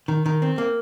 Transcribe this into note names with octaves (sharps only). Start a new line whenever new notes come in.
D#3
D#3
C4
A#3